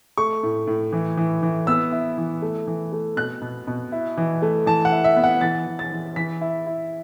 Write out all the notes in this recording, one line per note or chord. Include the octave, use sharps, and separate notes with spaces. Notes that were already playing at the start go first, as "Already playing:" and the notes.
A3 C#6
A2
A2
E3
E3
E3
B3 E6
E4
E3
A3
E3
A3
B2 F#6
B2
B2
E4
E3
A3
E3 A5
F#5
E4
E5
B3
F#5
E3 A6
E3
A6
E3
E3 B6
E4
E4